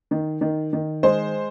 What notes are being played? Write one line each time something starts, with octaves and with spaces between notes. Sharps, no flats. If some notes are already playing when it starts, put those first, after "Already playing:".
D#3
D#3
D#3
G#3 C5